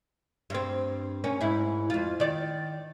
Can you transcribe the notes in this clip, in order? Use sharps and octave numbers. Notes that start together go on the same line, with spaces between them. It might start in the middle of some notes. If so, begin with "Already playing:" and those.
G2 C4
A#3 C#4
G#2 E4
F2 F4
D#3 D5